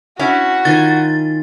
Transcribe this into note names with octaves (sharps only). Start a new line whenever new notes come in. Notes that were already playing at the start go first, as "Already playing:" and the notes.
C#4 E4 F#4
D#3 F4 G#5 A6